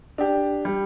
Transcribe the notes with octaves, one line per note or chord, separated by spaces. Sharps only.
D4 G4
G3